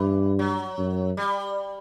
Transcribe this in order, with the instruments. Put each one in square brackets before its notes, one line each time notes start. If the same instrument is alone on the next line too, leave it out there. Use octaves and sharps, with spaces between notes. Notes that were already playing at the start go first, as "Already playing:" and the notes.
Already playing: [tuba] G2 [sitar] E3
[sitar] F#3
[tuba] F#2
[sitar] G3